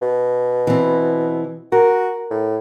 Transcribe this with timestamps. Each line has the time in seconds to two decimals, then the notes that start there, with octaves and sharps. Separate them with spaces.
0.02 B2
0.67 E3 C4
1.72 F#4 A#4
2.31 A2